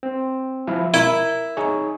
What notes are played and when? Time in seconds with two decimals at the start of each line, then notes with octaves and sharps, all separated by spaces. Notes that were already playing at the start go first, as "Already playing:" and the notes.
0.03 C4
0.67 F3 E4 F5
0.94 E4 A#4
1.57 D#4 G#4 C#5